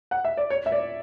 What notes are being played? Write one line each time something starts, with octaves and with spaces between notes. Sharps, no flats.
F#5
E5
D5
C#5
E5
D5